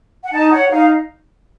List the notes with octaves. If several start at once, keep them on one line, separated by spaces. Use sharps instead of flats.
F#5
D#4 A5
C#5 F#5
D#4 F5